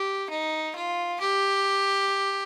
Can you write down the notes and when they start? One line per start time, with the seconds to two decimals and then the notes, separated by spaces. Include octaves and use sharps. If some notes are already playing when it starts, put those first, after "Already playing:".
Already playing: G4
0.30 D#4
0.76 F4
1.20 G4